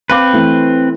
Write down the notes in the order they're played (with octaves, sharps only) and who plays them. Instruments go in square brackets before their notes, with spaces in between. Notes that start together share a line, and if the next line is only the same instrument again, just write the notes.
[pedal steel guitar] C4 B4 [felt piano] F5 D6
[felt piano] E3 A3